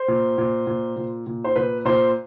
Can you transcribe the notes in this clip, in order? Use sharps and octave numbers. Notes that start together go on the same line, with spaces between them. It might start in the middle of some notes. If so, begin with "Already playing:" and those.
Already playing: C5
A#2
A#2
A#2
A#2
A#2
C5
A#2 B4
A#2 C5